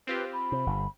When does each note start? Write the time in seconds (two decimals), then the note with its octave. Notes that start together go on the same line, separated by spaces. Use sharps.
0.07 C4 F4 G4 B4
0.33 B5
0.52 C3
0.66 G1